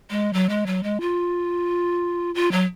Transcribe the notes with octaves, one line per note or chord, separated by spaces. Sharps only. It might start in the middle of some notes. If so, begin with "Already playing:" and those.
G#3
F#3
G#3
F#3
G#3
F4
F4
F#3